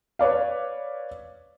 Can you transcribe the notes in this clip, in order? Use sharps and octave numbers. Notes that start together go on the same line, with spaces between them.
B4 C#5 D5 F5